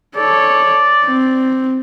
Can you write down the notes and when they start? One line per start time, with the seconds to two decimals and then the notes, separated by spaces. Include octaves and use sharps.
0.16 A4 C#5 D5
1.04 C4